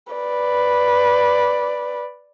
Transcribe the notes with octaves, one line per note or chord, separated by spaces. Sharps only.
B4 D5